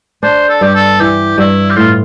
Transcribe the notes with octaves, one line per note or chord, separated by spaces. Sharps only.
D4 C5
A4
G2 G4
A4
E3 G4
G2 E4
G4
A2 F4